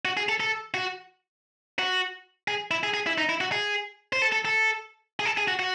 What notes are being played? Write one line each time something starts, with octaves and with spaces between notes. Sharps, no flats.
F#4
G#4
A4
A4
F#4
F#4
G#4
E4
G#4
G#4
E4
D#4
E4
F#4
G#4
C5
A4
A4
A4
G#4
A4
G#4
F#4
F#4